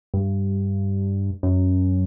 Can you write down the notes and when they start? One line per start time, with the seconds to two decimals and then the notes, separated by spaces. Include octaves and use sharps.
0.14 G2
1.43 F#2